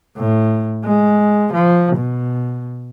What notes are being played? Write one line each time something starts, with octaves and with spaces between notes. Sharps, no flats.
A2
G#3
F3
B2